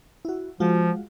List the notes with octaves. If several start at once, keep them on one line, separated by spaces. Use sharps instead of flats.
E4 F#4
F3 G#3 F4 F#4